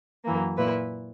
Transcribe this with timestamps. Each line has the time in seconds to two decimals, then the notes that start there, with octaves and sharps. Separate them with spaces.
0.24 F#2 E3 A#3
0.57 A#2 A#3 E4 B4